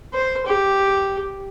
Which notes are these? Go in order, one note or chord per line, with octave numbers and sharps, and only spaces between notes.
C5
G4